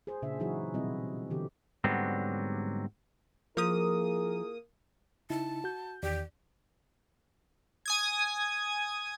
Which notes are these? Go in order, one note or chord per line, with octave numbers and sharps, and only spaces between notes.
G#4 C5
A#2 C#3 D4 E5
E3 F#3 D#4 E4 F#4 G#4
B2 F#3 G3 C4 E4 D#5
D3 E3 B3 G4
G#2 D3 F#3 G3 B3 C4
F3 A#3 E4 F4 G#4 A#4 D#6
C#3 D#4 E4 A5
F#4 G6
E2 D#3 G4 D5
G#5 D#6 G#6